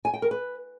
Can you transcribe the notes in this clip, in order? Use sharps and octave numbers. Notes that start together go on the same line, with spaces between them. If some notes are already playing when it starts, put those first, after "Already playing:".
G#5
G5
A#4
B4